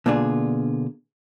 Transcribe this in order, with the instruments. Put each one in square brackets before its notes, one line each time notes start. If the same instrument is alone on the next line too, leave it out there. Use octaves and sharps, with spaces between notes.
[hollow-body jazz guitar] B2 D3 A#3 D4 F4 G#4